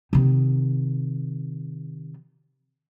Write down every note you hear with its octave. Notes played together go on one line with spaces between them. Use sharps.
C3 D#3